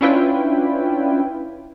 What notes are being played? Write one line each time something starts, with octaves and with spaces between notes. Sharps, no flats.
C#4 D4 E4 F4 B4 G5